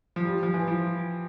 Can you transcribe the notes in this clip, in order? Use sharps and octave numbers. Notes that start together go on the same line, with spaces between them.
F3
G3
F3
E3
F3